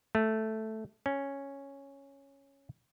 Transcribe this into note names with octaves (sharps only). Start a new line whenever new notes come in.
A3
C#4